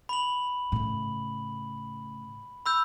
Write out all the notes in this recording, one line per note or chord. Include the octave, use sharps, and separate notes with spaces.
B5 F#7
A2 C#3
B5 E6 G6